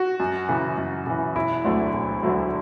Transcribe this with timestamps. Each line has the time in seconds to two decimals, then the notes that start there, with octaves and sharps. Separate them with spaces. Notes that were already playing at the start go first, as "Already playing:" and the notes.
Already playing: F#4
0.20 F#2
0.49 C#3 E3
0.78 F#2
1.07 C#3 E3
1.35 E1 E4
1.64 D2 D3 F#3 A3
1.93 E1
2.23 D2 D3 F#3 A3